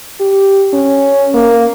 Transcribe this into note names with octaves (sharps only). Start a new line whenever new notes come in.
G4
C#4
A#3